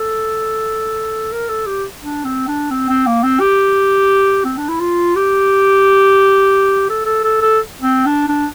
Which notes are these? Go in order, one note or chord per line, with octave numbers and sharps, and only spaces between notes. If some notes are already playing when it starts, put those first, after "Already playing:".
Already playing: A4
A#4
A4
G4
D4
C4
D4
C4
C4
A#3
C4
G4
C4
D4
E4
F4
G4
A4
A4
A4
A4
C4
D4
D4